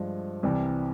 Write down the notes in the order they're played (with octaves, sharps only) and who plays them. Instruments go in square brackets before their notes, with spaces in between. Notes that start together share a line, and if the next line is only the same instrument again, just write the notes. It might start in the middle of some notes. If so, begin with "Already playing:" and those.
Already playing: [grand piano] G2 F3 G#3
C2 C3 E3 G3